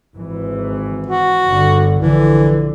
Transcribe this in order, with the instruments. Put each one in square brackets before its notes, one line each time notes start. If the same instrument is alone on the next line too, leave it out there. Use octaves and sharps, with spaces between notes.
[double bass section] G#1 E3
[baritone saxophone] F#4
[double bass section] G1 D3
[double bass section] A#1 D3 [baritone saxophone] E3